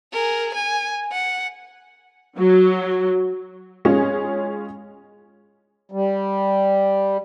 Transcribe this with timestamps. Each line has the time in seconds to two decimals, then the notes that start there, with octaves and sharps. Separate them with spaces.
0.13 G#4 A#4
0.54 G#5
1.12 F#5
2.38 F#3
3.85 G#3 C#4 F4 G#4 C#5
5.92 G3